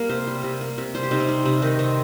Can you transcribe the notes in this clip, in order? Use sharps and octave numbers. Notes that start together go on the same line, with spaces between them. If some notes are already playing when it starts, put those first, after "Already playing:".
Already playing: G3 A#3 A#4 F5
C3 C5
G3
C3
A#3
C3
G3 C5
G4
C3 D#4
C4
G3
C3
D#3 D#4
C3 C4